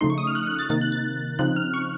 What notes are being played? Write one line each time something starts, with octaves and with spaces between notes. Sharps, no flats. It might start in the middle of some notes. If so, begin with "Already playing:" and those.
C#3 F3 A3 D#4 C6
C#6
D#6
F6
F#6
F#6
A6
C3 D#3 A#3 D#4 A6
F#6
A6
C#3 F3 C4 D#4 F#6
F6
C#6